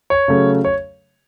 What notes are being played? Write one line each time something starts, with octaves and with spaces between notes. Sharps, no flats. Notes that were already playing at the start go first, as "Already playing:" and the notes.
C#5
C#3 F#3 A3 C#4
C#5